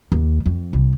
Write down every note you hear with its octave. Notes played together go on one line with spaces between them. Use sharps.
D#2
F2
C2